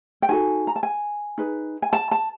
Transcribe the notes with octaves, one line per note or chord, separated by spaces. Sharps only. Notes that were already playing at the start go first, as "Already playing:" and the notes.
G5
D#4 F#4 A4 G#5
A#5
A5
G#5
D#4 G#4 B4
G#5
A5
A5